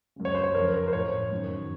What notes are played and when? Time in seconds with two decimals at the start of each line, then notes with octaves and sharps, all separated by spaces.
0.16 F#2 C#3
0.25 C#5
0.35 C5
0.44 C#5
0.55 F2 C#3 A#4
0.74 A#4
0.87 C5
0.93 A2 C#5
1.31 F#2 D#3